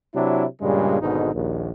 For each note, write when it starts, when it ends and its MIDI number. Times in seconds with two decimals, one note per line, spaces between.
0.14 0.44 48
0.14 0.44 54
0.14 0.44 62
0.14 0.44 64
0.61 0.99 43
0.61 0.99 46
0.61 0.99 49
0.61 0.99 55
0.61 0.99 56
1.00 1.30 32
1.00 1.30 44
1.00 1.30 47
1.00 1.30 50
1.00 1.30 63
1.33 1.70 34
1.33 1.70 39